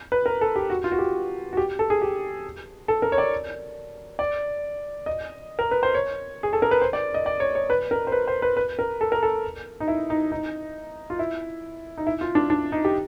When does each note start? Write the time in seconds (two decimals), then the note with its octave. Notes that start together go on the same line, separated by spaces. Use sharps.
0.12 B4
0.26 A#4
0.41 A4
0.56 G4
0.70 F#4
0.84 F4
0.92 F#4
0.98 G4
1.53 F#4
1.57 G4
1.79 A4
1.90 G#4
2.02 G4
2.88 A4
3.02 A#4
3.12 C#5
3.18 D5
4.19 D5
5.06 D#5
5.59 A#4
5.71 B4
5.83 C5
5.95 C#5
6.43 G#4
6.53 A4
6.62 A#4
6.71 B4
6.82 C5
6.93 D5
7.14 D#5
7.26 D5
7.40 C#5
7.55 C#5
7.70 B4
7.91 A#4
8.07 C5
8.12 B4
8.28 C5
8.42 B4
8.57 B4
8.79 A#4
9.01 A4
9.12 A#4
9.23 A4
9.80 D#4
9.88 E4
10.10 D#4
10.32 D#4
11.10 F4
11.19 E4
11.98 D#4
12.07 E4
12.21 F4
12.35 D4
12.50 D4
12.72 D#4
12.85 G4